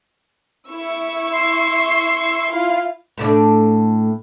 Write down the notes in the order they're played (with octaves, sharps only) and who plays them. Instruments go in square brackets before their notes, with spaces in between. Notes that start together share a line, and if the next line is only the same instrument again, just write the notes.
[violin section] E4 C#6 E6
[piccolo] C6
[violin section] E4 F4 F5
[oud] A2 A3 D4